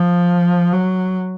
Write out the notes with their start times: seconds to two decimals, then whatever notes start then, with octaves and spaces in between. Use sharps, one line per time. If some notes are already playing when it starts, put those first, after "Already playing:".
Already playing: F3
0.73 F#3